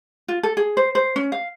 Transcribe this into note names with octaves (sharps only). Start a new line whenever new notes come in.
F4
A4
G#4
C5
C5
C#4
F5